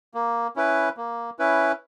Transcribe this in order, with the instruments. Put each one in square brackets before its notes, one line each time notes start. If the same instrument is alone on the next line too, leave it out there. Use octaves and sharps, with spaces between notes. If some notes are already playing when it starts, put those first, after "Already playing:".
[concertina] A#3
C#4 E4 B4
A#3
C#4 E4 B4